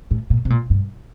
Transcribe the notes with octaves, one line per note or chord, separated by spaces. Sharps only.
A2
A#2
C3
A#2
G2